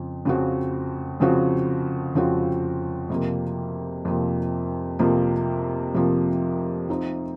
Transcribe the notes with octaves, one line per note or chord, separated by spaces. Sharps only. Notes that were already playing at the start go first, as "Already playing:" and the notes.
Already playing: F2 C#3 F3 C4
F2 C#3 F3 C4 F#4
F2 C#3 F3 C4 F#4
F2 C#3 F3 C4 F#4
F2 C3 F3 A#3
F2 C3 F3 A#3
F2 C3 F3 A#3
F2 C3 F3 A#3
F3 C4 D#4